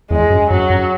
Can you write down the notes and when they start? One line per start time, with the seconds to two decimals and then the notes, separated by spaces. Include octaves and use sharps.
0.11 E2 G#3
0.30 F#2
0.50 F#2 F#3
0.70 F#2